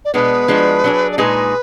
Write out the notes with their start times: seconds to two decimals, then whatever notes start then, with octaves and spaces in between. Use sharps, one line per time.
0.05 D5
0.14 B2 G#3 B3 D4 B4
0.48 F3 G#3 D4 F#4
0.84 F#3 D4 G#4
1.12 D5
1.18 A#2 G#3 D#4 G#4 B4